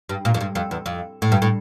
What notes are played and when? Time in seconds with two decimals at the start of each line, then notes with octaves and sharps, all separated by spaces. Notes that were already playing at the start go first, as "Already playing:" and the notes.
0.09 G2
0.25 A#2
0.34 F2
0.41 G2
0.55 F2
0.71 E2
0.86 F2
1.22 A2
1.32 G2
1.42 A2